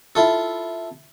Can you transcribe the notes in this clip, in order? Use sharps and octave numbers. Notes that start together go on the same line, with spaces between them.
E4 F4 A4